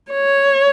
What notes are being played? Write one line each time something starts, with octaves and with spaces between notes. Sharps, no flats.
C#5